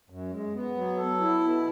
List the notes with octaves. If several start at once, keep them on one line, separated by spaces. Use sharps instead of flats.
F#2
G#3
B3
F#3
A4
E4
B2